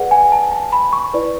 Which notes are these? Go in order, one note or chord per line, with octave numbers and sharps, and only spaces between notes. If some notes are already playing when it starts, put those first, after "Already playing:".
Already playing: G#4 B4 D5 F#5
G#5
A5
A5
B5
C#6
E4 B4 D5